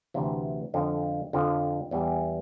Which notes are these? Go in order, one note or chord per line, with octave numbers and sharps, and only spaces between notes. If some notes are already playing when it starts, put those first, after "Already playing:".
D2 C3 E3
F2 D3 F3
F2 D3 F3
E2 E3 G3